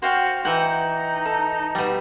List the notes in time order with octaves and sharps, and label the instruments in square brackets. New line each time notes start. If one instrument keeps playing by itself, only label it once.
[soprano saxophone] F#4 [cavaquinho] C5 F5 G5
[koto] E3 F#5 [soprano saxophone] D#4 [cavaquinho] G5
[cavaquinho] A4
[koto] B2 G3